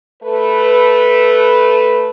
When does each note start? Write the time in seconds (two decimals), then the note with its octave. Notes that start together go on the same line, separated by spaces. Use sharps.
0.23 A3 A4 B4